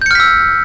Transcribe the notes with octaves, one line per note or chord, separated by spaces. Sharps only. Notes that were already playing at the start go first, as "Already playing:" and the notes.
E6 F6 G6 B6 C#7